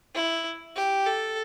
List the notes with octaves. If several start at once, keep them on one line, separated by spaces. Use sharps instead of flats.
E4
G4
A4